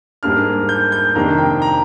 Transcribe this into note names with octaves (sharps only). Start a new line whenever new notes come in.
G#2 G3 A#3 D4 F6
G6
G6
F2 C3 D#3 A#3 D4 A#5
G5
A#5